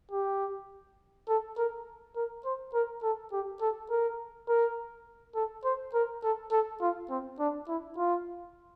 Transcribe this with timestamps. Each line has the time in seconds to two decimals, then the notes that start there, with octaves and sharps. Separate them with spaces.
0.11 G4
1.28 A4
1.57 A#4
2.16 A#4
2.45 C5
2.73 A#4
3.03 A4
3.32 G4
3.61 A4
3.90 A#4
4.48 A#4
5.35 A4
5.64 C5
5.94 A#4
6.23 A4
6.52 A4
6.81 F4
7.10 C4
7.39 D4
7.68 E4
7.97 F4